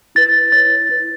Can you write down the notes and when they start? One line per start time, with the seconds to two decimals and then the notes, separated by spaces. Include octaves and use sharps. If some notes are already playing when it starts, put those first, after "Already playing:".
0.15 E4 B4 A6
0.52 E4 C#5 A6
0.89 E4 B4